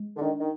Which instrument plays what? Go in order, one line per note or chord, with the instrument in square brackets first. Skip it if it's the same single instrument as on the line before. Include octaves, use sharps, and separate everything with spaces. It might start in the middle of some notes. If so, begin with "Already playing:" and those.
Already playing: [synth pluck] G#3
[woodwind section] D3
[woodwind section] D#3 [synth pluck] D4
[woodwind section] D#3